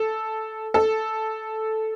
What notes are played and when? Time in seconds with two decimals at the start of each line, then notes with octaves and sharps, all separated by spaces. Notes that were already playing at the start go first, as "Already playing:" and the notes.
Already playing: A4
0.74 A4